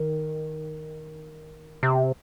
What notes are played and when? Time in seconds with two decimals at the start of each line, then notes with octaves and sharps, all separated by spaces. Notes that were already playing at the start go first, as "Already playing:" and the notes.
Already playing: D#3
1.83 C3